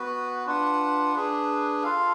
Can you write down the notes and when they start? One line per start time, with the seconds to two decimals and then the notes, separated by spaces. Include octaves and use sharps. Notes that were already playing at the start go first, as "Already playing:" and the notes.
Already playing: B3 F#4 B4
0.46 D4 F4 B4 F#5
1.15 D4 G#4 B4
1.83 F4 A4 F5